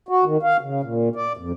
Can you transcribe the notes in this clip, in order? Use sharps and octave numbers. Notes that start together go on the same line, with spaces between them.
F#4
D#3
F5
C#3
A#2
D5
F2